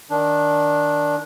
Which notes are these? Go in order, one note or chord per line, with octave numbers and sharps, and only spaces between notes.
D#3 D4